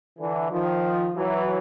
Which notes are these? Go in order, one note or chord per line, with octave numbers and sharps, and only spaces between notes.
D3 E3
D#3 F3
E3 F#3